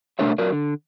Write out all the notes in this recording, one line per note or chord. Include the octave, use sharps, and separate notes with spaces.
B2 A3 D4 A#4 C#5 E5
F#3 A#4 D5
D3